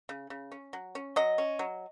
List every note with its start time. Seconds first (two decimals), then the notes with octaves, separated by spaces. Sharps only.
0.09 C#3
0.30 C#3
0.52 C#4
0.73 F#3
0.95 C#4
1.16 F#3 D#5
1.38 C#4
1.59 F#3